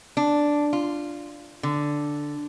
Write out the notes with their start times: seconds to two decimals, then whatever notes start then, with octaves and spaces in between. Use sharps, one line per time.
0.17 D4
0.73 F4
1.63 D3